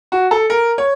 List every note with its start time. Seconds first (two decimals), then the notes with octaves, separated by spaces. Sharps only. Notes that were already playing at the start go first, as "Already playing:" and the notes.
0.12 F#4
0.31 A4
0.50 A#4
0.78 C#5